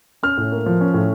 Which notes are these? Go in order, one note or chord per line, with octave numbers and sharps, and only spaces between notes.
C#4 F6
A2
A#3
F3
C#4
A2